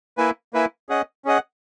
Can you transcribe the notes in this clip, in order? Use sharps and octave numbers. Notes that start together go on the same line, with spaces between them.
A#3 E4 B4 E5 G#5
A#3 E4 B4 E5 G#5
C#4 G#4 D#5 F#5
C#4 G#4 D#5 F#5